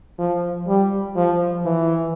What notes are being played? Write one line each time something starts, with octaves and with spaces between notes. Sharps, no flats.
F3
G3
F3
E3